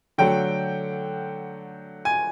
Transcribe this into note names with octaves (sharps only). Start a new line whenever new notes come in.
D3 F#3 A3 G5
G#5